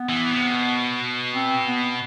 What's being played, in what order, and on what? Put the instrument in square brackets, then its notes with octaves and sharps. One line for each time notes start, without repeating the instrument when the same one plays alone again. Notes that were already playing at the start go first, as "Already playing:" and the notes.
Already playing: [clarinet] B3
[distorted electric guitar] E3
C3
B2
[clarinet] C4
B3